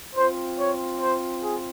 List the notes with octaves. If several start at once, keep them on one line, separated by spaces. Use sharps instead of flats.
C4 F4 C5
C#5
C5
G#4